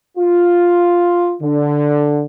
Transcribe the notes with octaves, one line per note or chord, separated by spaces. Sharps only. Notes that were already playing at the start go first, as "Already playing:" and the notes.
F4
D3